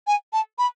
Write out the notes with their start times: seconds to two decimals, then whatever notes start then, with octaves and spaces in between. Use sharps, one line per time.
0.07 G#5
0.33 A5
0.58 B5